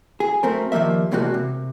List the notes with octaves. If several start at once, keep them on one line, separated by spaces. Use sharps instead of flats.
G#4
F#2 A3 C4 A#4
D#3 F3 G3 A#3 E5
E2 A2 C3 G#3 A#3 F#4
C3